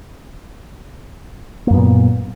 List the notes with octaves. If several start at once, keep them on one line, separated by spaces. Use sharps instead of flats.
F#2 A#2 A#3 B3